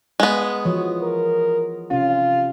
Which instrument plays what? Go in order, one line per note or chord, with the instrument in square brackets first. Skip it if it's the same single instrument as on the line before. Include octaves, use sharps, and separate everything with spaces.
[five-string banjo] G#3 B3
[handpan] E3 F3 C#5 [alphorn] F#4
[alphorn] A#4
[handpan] C3 C#4 [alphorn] F4